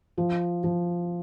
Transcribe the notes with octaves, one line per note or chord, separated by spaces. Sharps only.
F3
F3